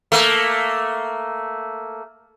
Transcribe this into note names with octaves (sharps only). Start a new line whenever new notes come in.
A3 A#3